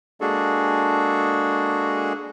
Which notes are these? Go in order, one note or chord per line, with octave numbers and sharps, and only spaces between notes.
G#3 A#3 D4 F#4 G#4 A4